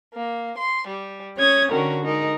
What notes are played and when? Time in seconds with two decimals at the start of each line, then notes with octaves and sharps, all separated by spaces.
0.14 A#3
0.57 C6
0.86 G3
1.36 C#4 C#5 D#6 G#6
1.70 D3 D#3 C#4 F#4 A#4
2.04 G#3 D#4 A#4